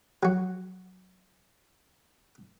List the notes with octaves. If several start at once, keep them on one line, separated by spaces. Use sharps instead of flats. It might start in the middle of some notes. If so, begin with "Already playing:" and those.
F#3 F#4